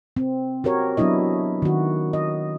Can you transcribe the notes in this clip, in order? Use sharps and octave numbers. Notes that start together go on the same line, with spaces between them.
C4
F#4 G4 A#4 C#5
F#3 B3 D4 E4 D#5
D#3 F#4
D#5